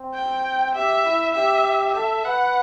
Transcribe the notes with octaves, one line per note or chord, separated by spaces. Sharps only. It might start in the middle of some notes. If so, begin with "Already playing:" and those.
Already playing: C4
G5
G4 E5
E4
G4 E5
A4 E5
B4 F#5